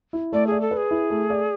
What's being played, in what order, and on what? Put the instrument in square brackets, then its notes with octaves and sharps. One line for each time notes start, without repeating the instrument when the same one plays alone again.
[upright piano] E4
[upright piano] A3 [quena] D5
[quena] G#4 [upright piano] D5
[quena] A4
[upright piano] B4
[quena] G#4
[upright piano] E4
A3
D5